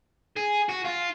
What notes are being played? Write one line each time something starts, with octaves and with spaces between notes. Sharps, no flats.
G#4
F#4
F4